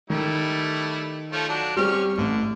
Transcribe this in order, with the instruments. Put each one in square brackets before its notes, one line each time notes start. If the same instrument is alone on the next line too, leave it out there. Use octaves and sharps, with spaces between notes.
[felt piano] D#3 [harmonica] G3 A3 E4
[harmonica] F3 A3 C#5
F#3 D4
[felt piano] G3 C4 G4 [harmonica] C#4 C#6 F6
[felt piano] A1 [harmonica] D3